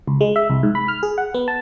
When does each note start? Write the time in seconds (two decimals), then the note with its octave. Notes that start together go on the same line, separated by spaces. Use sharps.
0.07 C#2
0.21 G#3
0.36 E5
0.50 C2
0.63 G#2
0.75 B5
0.88 F6
1.03 G#4
1.18 F#5
1.34 B3
1.48 A5